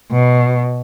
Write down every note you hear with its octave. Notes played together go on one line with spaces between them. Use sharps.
B2